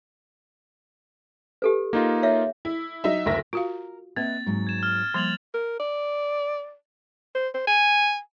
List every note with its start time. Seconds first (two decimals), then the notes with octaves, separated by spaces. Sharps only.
1.62 G4 A4 B4
1.93 A#3 D#4 F4
2.23 C#5 E5 F5
2.65 E4
3.04 F#3 D#4 E5
3.26 F#1 D2 A#4 E5 A#6
3.53 F4 F#4 A#4 F5
4.16 A#3 C4 B4 D#5 E5 A6
4.46 G#2 F#3
4.67 G#6 E7
4.83 F6
5.14 F3 G3 A#3 A6 F7 F#7
5.54 A#4
5.80 D5
7.35 C5
7.55 C5
7.67 G#5